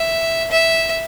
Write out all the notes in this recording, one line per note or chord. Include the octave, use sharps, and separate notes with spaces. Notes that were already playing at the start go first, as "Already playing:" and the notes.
Already playing: E5
E5